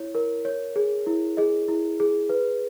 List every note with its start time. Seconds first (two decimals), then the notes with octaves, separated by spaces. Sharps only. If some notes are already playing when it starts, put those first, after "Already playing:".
Already playing: E4 C#5
0.15 A#4
0.45 C#5
0.76 G#4
1.06 E4
1.37 G#4 D#5
1.68 E4
2.00 G#4
2.29 B4